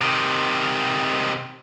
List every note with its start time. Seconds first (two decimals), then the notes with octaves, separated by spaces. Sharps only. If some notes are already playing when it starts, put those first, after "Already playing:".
0.01 C3 D#3